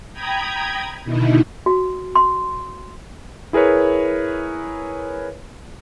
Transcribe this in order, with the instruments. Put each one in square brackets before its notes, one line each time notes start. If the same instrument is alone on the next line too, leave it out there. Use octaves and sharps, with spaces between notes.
[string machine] G5 A#5 B5 D#6 G#6
B2 D3 D#3 D#4 E4
[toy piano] F#4
C6
[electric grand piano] E4 G#4 A#4 B4 C#5